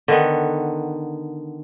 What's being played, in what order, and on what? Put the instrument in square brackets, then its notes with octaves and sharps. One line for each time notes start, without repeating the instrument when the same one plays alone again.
[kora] D3 D#3 B3